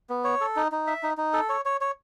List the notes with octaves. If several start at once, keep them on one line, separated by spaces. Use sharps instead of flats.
B3
C#5
A4
D#4
D#4
E5
D#4
D#4
A4
C#5
C#5
C#5